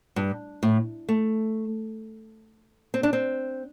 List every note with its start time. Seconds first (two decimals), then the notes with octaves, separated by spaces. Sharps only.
0.16 G2
0.63 A2
1.09 A3
2.94 C4
3.03 D4
3.13 C4